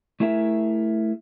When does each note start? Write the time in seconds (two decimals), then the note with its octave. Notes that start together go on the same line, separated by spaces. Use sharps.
0.20 A3 E4 G#4 A#4 E5